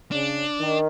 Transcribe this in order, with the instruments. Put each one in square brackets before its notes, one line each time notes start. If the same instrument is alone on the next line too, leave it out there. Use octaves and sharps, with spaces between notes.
[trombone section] C#3 [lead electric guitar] D4
[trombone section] D#3